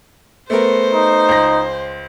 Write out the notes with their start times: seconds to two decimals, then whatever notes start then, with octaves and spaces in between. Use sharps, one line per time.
0.50 A3 B3 A#4 C5
0.94 D#4
1.29 C#2 A#6